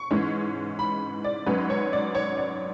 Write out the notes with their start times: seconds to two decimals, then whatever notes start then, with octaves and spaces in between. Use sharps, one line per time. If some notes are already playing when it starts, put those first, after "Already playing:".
Already playing: C#6
0.11 G#2 E3 G#3 C#4
0.79 B5
1.24 D5
1.46 G#1 G#2 F#3 C#4 B4
1.70 C#5
1.93 D5
2.15 C#5
2.38 D5